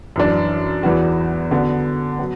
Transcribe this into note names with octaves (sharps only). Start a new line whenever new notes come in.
F#2 E3 D4
E2 E3 B3 F#4
D3 B3 F#4
F#3 B3